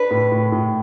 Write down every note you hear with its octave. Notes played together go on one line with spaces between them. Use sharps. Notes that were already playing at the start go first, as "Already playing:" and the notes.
Already playing: D4 B4
A2
A2
A2